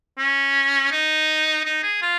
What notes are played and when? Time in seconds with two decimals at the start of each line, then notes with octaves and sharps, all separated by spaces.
0.18 C#4
0.92 D#4
1.65 D#4
1.83 G#4
2.02 F4